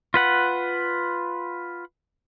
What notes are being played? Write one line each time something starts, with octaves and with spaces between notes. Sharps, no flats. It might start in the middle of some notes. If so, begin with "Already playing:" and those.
F4 B4 F#5